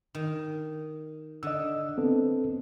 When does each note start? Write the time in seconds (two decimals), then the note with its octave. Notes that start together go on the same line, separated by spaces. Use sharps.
0.15 D#3
1.43 D3 D#5 E6
1.98 B3 C4 A4